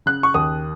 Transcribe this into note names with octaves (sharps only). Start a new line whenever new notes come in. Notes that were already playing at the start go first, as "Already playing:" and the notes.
C#3 F#6
C#6
D#2 D#6